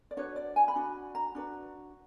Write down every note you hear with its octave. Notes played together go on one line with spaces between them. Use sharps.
D5
D4 F#4 B4 C#5
D5
G#5
B5
D4 F#4
A#5
D4 F#4 B4